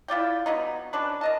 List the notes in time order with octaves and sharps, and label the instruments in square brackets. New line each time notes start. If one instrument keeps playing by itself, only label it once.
[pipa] E4 F4 D5 G5
F#3 B3 D#4
C#4 D4 B4
A#4 D#5 A5